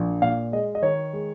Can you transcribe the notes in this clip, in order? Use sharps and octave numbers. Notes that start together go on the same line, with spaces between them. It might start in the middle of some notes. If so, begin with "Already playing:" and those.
Already playing: A#1
A#2 F5
G#3 D#5
D#5
D#3 C#5
G#3